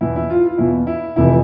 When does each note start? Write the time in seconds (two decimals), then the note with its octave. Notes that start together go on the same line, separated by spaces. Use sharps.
0.01 E2 B2 E4
0.16 E4
0.30 F4
0.45 F4
0.58 E2 B2 E4
0.87 E4
1.16 F1 F2 C3 E3 E4